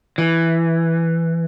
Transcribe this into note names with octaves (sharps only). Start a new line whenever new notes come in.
E3